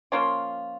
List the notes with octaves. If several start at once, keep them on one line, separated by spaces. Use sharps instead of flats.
F3 A#3 C#4 F4